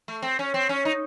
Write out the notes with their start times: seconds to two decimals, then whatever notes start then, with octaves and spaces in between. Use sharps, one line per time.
0.08 A3
0.22 C4
0.39 C#4
0.54 C4
0.69 C#4
0.85 D#4